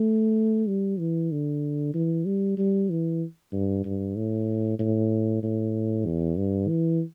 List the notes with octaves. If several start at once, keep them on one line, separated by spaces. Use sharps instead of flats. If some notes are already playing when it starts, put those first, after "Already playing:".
Already playing: A3
G3
E3
D3
E3
G3
G3
E3
G2
G2
A2
A2
A2
E2
G2
E3